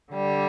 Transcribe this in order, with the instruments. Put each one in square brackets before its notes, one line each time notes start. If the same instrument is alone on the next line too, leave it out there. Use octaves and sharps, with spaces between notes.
[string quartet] D3 G3